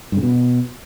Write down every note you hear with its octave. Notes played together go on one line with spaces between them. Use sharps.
G2
C#3
B2